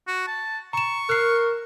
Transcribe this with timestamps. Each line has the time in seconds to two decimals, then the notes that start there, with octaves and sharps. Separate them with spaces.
0.07 F#4
0.27 A5
0.73 A#5 C#6 E7
1.09 A#4 F#6 C7